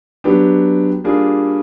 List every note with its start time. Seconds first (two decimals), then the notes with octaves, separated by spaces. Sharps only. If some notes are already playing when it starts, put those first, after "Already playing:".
0.24 F#3 B3 D4 G4
1.04 G3 A#3 D4 F4 G#4